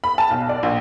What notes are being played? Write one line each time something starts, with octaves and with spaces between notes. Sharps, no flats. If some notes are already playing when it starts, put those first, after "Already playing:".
B5
A5
B1
D5
A#1